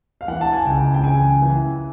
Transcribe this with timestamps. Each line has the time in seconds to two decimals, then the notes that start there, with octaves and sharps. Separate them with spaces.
0.21 F5
0.28 E3 F#5
0.41 A5
0.53 G#5
0.65 C#2 G5
0.94 G5
1.03 C#3 G#5
1.42 E3